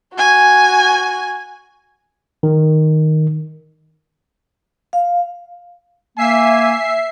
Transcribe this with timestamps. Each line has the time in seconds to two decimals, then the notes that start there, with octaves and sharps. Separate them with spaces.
0.14 F#4 G#5
2.43 D#3
4.93 F5
6.18 A#3 E5 G#5 C7